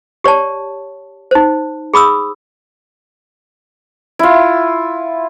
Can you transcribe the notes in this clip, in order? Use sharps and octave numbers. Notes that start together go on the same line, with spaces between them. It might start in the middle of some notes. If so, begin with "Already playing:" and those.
G4 C#5 D5 A5
D#4 C5
G#4 B5 D#6 E6
E4 F4